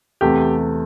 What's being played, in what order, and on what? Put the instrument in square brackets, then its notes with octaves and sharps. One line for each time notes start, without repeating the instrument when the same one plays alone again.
[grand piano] E2 C3 A3 [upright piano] G4